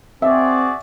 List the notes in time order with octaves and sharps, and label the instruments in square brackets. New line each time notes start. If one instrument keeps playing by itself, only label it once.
[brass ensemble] C4 [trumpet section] F#4 G#4 D5 [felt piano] E5